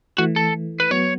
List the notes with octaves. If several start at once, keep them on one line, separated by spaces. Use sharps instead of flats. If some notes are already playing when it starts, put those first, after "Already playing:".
E3 A3 F#4
A4
B4
F#3 B3 C#5